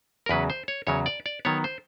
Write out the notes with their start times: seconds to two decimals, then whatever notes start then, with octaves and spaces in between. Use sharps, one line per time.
0.26 A#4
0.29 E2 C#3 F#3 B4
0.50 C5
0.68 C#5
0.87 E2 C#3 F#3 C#5
1.06 D5
1.26 D5
1.45 D#3 F#3 B3 C#5
1.64 C5